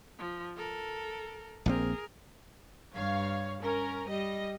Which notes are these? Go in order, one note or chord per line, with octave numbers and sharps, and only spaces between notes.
F3
A4 A#4
A#1 A#3 C4 G#4 A#4
G2 C#5 F5
C#4 A#4
G3 D#5